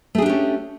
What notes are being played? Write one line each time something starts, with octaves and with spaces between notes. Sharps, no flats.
A3 C#4 D4 G4 G#4